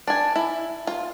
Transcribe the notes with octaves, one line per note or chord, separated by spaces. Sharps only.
D4 G#5
E4
F4